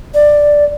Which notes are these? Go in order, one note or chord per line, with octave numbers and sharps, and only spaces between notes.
D5